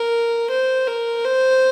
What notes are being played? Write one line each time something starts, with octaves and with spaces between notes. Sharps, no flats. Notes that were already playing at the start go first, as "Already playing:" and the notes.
Already playing: A#4
C5
A#4
C5